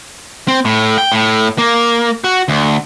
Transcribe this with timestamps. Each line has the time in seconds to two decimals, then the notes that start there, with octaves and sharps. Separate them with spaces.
0.48 C4
0.65 A2
0.98 G5
1.12 A2
1.58 A#3
2.24 F#4
2.48 D2